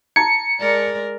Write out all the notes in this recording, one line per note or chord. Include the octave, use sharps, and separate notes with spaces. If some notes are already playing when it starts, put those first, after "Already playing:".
A5 A#5 G#6 C#7
G#3 A#4 D5